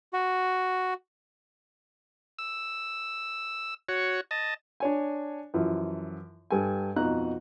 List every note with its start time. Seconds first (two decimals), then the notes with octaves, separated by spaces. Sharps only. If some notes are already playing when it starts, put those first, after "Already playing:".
0.13 F#4
2.39 E6
3.89 F#4 C#5
4.31 D#5 A5
4.80 D4 C#5 G#5
5.54 F#2 E3 F3
6.51 G2 A4 G#5
6.96 F2 B2 D#4 F#4 A#5 F#6